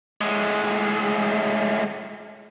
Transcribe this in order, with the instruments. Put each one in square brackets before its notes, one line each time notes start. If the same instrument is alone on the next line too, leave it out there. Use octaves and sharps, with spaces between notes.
[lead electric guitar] A2 G#3